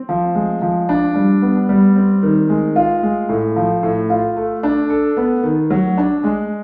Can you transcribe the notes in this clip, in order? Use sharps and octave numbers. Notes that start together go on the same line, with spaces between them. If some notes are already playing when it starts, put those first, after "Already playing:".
Already playing: C4
F3
G#3
F3
D4
G3
B3
G3
C4
D#3
G#3
F4
G#3
A2
F3
A2
F4
A3
D4
A4
B3
D#3
F#3
D4
G#3